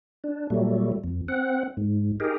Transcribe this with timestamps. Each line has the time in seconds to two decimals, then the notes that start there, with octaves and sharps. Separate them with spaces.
0.24 D4
0.50 A#2 F#3 G3 A3
1.04 F2
1.28 C4 F#5
1.77 G#2
2.20 D#4 G4 G#4 A#4